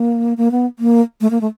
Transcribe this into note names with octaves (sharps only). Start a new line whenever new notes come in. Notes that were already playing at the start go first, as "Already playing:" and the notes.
Already playing: A#3
A#3
B3
A#3
A3
A#3
A3